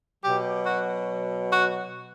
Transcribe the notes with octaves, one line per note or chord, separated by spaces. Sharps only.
B2 F#3 G4
F#4
F#4